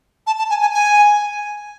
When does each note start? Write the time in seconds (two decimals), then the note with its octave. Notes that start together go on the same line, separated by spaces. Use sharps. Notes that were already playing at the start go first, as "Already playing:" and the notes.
0.27 A5
0.39 A5
0.50 G#5
0.61 G#5
0.74 G#5